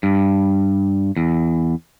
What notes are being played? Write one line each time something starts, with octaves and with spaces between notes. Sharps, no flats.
G2
E2